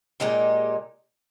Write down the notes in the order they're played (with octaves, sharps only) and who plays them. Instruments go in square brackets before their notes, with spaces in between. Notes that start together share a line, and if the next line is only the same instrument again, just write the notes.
[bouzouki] A#2 G#3 D#4 G4